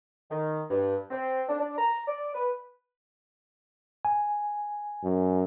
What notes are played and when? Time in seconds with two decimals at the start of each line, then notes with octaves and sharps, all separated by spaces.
0.31 D#3
0.70 G2
1.10 C4
1.49 D4
1.60 D4
1.78 A#5
2.08 D5
2.35 B4
4.05 G#5
5.04 F#2